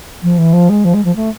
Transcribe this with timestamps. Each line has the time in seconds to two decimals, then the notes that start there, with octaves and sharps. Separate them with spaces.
0.23 F3
0.38 E3
0.53 F3
0.69 G#3
0.84 F3
0.94 G#3
1.05 F3
1.16 A3